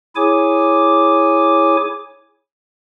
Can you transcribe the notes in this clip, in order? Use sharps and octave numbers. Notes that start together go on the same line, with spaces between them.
E4 G#4 C#5 G#5 D6